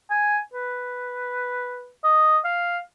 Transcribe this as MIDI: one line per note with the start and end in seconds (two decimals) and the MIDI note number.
0.10 0.39 80
0.54 1.90 71
2.04 2.38 75
2.45 2.79 77